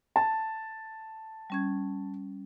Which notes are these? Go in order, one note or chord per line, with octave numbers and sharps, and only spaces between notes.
A5
G3 C#4 G#6